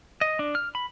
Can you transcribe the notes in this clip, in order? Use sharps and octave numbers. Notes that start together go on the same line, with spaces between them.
D#5
D4
F6
B5